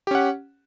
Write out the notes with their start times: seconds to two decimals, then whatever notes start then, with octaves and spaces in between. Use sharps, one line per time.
0.07 G4
0.11 C#4
0.15 F#5